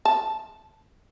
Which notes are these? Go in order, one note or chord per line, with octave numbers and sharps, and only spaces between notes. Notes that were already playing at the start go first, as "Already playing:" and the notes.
A5